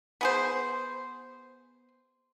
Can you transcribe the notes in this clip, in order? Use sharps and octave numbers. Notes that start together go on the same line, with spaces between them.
B3 G#4 C5